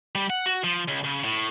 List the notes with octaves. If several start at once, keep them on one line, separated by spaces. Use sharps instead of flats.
G3
F#5
F#4
F3
C#2
C#3
A2